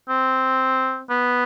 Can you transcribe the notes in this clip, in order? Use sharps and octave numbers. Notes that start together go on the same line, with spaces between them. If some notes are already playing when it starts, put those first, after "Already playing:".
C4
B3